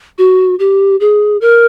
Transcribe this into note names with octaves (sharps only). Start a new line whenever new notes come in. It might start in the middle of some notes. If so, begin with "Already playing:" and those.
F#4
G4
G#4
A#4